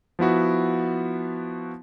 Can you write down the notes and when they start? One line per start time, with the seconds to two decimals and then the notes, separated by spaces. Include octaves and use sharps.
0.19 F3 B3 E4 F#4